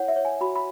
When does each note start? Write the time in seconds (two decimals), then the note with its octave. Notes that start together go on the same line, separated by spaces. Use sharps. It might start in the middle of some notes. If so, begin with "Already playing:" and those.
Already playing: E4 C#5 F#5
0.08 E5
0.16 C#5
0.25 G#5
0.41 F#4 B5
0.56 B5